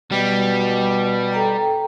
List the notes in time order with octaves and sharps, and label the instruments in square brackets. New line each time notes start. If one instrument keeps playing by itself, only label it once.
[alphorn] B2 [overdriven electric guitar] G3
[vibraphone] A4 G5 A#5